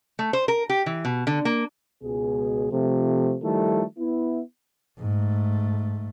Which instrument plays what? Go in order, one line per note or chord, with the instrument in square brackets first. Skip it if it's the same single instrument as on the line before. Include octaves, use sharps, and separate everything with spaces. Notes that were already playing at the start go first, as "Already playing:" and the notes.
[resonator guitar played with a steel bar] A3
C5
A#4
G4
E3
B2
D3
A#3
[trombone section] C#2 B2 G#4
C3 F3 A3
D#3 F3 G3 A3 E4 A4
B3 E4
[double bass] G#2 A3